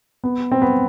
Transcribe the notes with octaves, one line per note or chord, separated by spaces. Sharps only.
B3
C4
B3